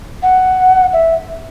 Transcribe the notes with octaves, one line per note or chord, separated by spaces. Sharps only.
F#5
E5